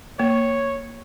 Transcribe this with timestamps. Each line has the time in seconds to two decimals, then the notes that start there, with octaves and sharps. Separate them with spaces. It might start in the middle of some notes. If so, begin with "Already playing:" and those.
0.19 A#3 C#5